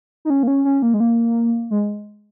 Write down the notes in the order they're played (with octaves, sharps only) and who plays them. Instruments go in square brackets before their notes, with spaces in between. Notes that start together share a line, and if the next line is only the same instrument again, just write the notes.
[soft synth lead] D#4
C#4
A#3
C#4
C#4
A#3
G#3
A#3
G#3